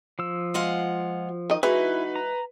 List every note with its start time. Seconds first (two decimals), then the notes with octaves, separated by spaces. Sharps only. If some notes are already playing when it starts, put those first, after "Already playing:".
0.19 F3 E6
0.54 G#3 F4 F#5
1.50 D#3 D#5
1.63 E3 G#3 D#4 E4 F#4 B4
2.16 A#5